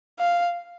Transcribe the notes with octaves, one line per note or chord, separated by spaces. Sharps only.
F5